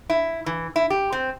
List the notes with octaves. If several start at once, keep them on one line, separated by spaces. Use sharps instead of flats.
E4
E3
E4
G4
C4